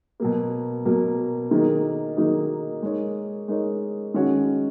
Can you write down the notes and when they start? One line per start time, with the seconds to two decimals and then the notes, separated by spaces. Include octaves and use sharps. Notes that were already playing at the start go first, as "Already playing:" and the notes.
0.20 B2 F#3 A#3
0.85 B2 F#3 A#3
1.51 D#3 F#3 A#3 D#4 G#4
2.17 D#3 F#3 A#3 D#4 G#4
2.82 G#3 D#4 A#4 C#5
3.48 G#3 D#4 A#4 C#5
4.14 D#3 G#3 C#4 F#4 C#5